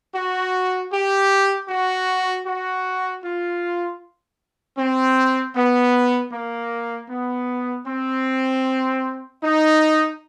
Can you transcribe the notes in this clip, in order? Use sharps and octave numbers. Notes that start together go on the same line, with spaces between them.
F#4
G4
F#4
F#4
F4
C4
B3
A#3
B3
C4
D#4